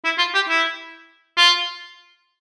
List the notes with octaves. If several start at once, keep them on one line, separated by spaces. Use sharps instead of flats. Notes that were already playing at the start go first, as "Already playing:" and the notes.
E4
F4
G4
E4
F4